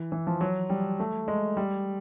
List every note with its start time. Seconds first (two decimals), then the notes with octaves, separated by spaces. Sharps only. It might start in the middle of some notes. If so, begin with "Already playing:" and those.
Already playing: E3
0.12 E3
0.27 F3
0.41 F#3
0.70 G3
1.00 A3
1.28 G#3
1.57 G3